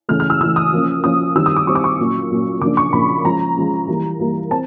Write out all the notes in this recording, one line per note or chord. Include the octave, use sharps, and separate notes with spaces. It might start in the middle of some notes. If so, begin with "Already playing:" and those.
C#3 E3 A3 F6
F6
E6
C#3 E3 A3 E6
D#6
F3 A#3 C#4
F3 A#3 C#4 D#6
D#3 G3 C4 E6
D#6
D6
D#3 G3 C4 C#6
D6
C#6
A#2 F#3 A#3 C#4
A#2 F#3 A#3 C#4
C#3 F3 A#3 D4 D6
C#6
C#3 F3 A#3 D4 B5
F3 G#3 C#4 A#5
F3 G#3 C#4
E3 G3 A#3
E3 G3 A#3
C4 A5